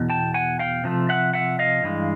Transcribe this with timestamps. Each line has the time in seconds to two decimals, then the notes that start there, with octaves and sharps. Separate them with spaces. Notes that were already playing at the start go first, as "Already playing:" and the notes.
Already playing: E2 B2
0.10 G5 A5
0.34 F#5 G#5
0.59 F5 G5
0.84 C3 F3 A3
1.09 E5 F#5
1.33 E5 F#5
1.59 D#5 F5
1.83 G2 E3 G#3